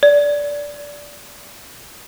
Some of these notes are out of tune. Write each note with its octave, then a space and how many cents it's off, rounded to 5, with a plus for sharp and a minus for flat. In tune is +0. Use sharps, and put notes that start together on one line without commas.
D5 -15